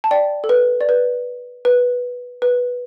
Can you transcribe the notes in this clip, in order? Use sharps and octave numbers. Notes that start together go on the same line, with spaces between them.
A5
D5 G5
A4
B4
D5
B4
B4
B4